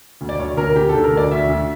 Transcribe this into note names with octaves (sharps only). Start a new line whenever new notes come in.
D2
D5
D2 C#5
D2 A#4
D2 G4
D3 A4
A#4
D2 D5
D2 E5
D2